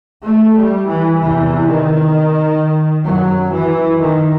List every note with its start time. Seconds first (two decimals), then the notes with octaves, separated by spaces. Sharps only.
0.24 A3
0.56 G3
0.86 E3
1.17 E2 C3 E3
1.64 D#3
3.05 F#2 F#3
3.52 E3
4.00 D#3